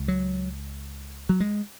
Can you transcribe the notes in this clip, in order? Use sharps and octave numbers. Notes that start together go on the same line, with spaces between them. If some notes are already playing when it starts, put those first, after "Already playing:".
Already playing: C#2 C#3
F#3
F#3
G#3